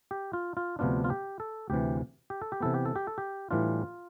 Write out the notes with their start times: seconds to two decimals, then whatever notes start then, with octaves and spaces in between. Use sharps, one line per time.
0.11 G4
0.33 F4
0.57 F4
0.79 D2 C3 F3 B3 D4 F4
1.04 F4
1.10 G4
1.40 A4
1.70 D2 C3 E3 G4
2.30 G4
2.42 A4
2.52 G4
2.60 C3 E3 B3 A4
2.74 G4
2.85 A4
2.96 G4
3.07 A4
3.18 G4
3.51 A2 E3 G3 D4 F4